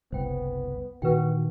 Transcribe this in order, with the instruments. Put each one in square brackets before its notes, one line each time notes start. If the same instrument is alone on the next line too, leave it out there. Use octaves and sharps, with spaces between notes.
[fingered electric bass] F#1 C2 [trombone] B3 [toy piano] C5 G5
[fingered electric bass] A#2 D#3 E3 [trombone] F#4 [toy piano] B4 G5